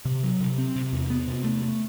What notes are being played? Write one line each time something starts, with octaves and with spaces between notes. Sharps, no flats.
C3
F#3
C3
C4
C3
E2
B3
C3
A3
A3